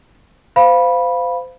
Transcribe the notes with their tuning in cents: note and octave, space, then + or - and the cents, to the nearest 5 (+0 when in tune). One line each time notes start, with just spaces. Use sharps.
C5 -30 F5 +0 B5 -10